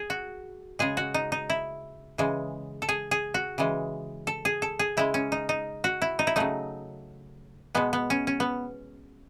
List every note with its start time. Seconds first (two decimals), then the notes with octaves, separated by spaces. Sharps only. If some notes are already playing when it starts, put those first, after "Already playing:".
Already playing: G#4
0.10 F#4
0.79 C#3 G#3 G#4
0.97 F#4
1.14 D#4
1.32 D#4
1.50 E4
2.18 C#3 E3 G#3
2.82 A4
2.89 G#4
3.11 G#4
3.34 F#4
3.58 C#3 E3 G#3
4.27 A4
4.45 G#4
4.62 A4
4.79 G#4
4.97 C#3 G#3 E4
5.14 C#4
5.32 D#4
5.49 D#4
5.84 F#4
6.02 E4
6.19 D#4
6.27 E4
6.36 C#3 F#3 A3 D#4
7.75 B2 G#3 B3
7.93 B3
8.10 C#4
8.27 C#4
8.40 B3